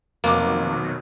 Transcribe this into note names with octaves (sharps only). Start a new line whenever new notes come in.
F1 F2 B2 D#3 F#3 A#3 D6